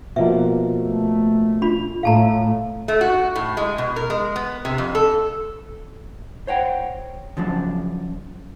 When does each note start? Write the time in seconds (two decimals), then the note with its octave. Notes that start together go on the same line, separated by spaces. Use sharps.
0.16 B2 F3 A#3 E5
0.78 A3
1.62 D4 F4 B5
2.03 A2 A3 F5 A5 A#5
2.88 A3
3.01 F#4
3.35 A2
3.57 G#3
3.78 B2
3.96 A#4
4.10 G#3
4.36 B3
4.65 C3
4.78 F2
4.95 A4
6.47 C5 C#5 F#5 G5
7.37 C#3 F3 F#3 D4